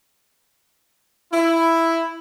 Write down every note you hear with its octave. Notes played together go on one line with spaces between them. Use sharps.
E4